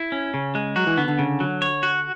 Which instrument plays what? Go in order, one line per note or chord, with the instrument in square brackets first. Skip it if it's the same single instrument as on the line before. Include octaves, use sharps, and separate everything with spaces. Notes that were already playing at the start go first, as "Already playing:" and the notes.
Already playing: [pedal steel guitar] E4
C#4
C#3
G#3
[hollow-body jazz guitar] F#3 [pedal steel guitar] F#4
[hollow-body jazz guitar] E3
[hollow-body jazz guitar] D3 [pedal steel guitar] B3
[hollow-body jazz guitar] D3
[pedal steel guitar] C#3
F#3
C#5
F#4